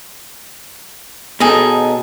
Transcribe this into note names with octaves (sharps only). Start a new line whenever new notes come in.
B2 D#4 G#4 A4